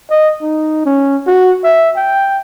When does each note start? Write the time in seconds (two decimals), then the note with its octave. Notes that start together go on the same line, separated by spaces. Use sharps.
0.10 D#5
0.42 D#4
0.85 C#4
1.26 F#4
1.64 E5
1.96 G5